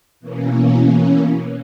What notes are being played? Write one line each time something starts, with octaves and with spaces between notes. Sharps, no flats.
B2 E3 A#3 C#4